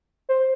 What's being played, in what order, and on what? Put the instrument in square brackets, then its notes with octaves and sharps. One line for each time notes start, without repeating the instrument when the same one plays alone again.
[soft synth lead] C5